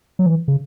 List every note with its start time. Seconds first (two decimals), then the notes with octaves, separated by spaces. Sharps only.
0.19 F#3
0.26 E3
0.48 C#3